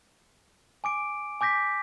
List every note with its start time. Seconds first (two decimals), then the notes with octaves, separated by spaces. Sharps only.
0.84 G#5 D6 D7
1.41 G#5 D6 G6 A#6 B6